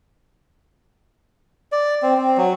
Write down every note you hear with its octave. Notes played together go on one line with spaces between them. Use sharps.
D5
C4
C4
F#3